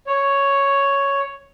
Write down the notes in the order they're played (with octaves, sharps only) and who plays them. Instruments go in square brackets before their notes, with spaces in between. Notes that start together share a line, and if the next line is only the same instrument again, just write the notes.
[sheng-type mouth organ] C#5